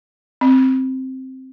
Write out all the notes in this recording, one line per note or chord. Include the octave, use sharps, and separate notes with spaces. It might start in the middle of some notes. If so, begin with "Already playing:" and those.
C4